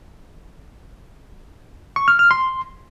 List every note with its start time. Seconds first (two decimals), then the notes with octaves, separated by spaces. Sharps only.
1.96 C#6
2.08 F6
2.19 F6
2.31 C6